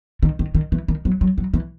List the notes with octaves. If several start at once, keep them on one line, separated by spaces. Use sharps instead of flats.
D#3
D#3
D#3
E3
D#3
F#3
F#3
F#3
E3